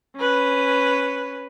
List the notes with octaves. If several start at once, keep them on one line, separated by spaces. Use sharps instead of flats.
C#4 B4